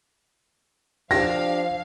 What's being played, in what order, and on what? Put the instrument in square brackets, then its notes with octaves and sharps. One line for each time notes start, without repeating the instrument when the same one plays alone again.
[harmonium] F3 [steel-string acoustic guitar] D4 G4 [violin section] F5 [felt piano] A#6